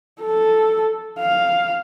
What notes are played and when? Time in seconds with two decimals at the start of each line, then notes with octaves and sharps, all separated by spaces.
0.22 A4
1.19 F5